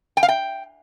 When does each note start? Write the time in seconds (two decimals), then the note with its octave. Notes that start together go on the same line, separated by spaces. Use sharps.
0.17 G5
0.23 F5
0.28 G5